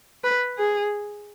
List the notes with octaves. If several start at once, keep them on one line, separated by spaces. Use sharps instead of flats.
B4
G#4